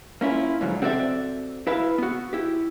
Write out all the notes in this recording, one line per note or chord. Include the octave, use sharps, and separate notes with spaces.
A#3 C#4 E4 F4
G#2 D3 F3 F#3
C4 F#4 A4 C#5 D5 E5
E4 B4 E5 F5
B3 F#4
E4 G4